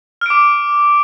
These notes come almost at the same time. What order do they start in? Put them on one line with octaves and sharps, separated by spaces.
F6 D7 D6